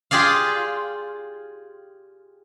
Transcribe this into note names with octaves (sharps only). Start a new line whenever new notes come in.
F4 G4 G#4 D5 F5